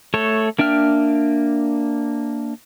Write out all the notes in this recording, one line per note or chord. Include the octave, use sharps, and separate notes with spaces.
A3 A4 C#5
A#3 D4 E5 G5 F6